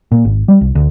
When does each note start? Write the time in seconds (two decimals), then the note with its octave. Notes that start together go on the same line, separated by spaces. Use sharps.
0.12 A#2
0.25 G#1
0.48 G3
0.61 C2
0.75 D2